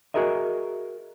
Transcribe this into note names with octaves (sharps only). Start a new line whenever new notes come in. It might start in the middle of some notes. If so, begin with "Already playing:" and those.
F#4 G#4 A#4 D#5 E5